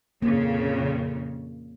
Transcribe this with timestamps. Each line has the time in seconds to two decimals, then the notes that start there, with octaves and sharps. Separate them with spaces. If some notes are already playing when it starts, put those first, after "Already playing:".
0.22 F2 A#2 C#3 A#3